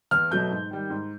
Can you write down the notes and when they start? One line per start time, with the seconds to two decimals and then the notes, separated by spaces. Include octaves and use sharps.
0.11 E2 F6
0.31 B2 F#3 A3 G6
0.51 G#2
0.71 D#3 G3
0.90 G#2